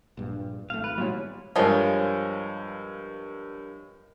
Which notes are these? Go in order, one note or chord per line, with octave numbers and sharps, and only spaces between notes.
A#1 G2
G#1 A3 F5
B4
C2 A#2 G3 C#5
G2 F3 G#3 A#4 C#5